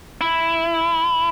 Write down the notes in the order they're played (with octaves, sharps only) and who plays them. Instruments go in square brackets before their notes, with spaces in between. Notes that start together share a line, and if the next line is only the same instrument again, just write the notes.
[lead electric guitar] E4